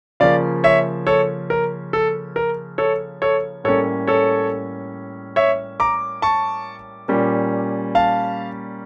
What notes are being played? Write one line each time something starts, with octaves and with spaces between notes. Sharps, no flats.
C#3 F3 A#3 C#4 D5 F5
C#5 E5
A4 C#5
A#4
A4
A#4
A4 C#5
A4 C#5
A2 G3 A#3 C#4 A4 C#5
A4 C#5
C#5 E5
A#5 D6
A5 C#6
A#2 G3 A#3 C#4
F5 A5